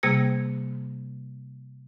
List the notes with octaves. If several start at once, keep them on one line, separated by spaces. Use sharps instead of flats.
C3 G3 A#3 G#4 G#6